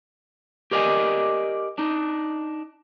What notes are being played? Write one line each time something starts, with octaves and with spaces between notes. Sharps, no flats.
G4 A#4 D5 D#5 G#5
D4 D#4